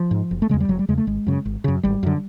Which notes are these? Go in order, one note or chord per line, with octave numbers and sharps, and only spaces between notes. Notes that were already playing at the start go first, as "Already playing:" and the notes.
Already playing: F3
G#2
F#1
A3
E2 C#3 G#3
G3
F#1 F#3
G3
E2 C#3 G#3
A3
G#1 G#3
F#2 C#3
G#1
F#2 C#3
G#1 G3
F#2 D3